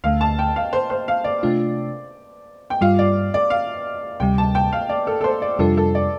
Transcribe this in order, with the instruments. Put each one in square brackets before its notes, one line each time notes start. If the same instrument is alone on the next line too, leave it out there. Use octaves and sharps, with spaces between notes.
[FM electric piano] D2 D3 A3 [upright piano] F5
[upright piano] A5
G5
F5
C5
C5
F5
D5
[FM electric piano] C3 A3 D4 F4
[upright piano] G5
[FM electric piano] G2 G3 F4 [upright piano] F5
[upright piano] D5
D5
F5
[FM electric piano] D2 C3 G3 [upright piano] G5
[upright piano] A5
G5
F5
D5
A4
A4
C5
D5
[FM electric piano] F2 C3 G3 D4 F4 [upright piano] A4
[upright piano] A4
D5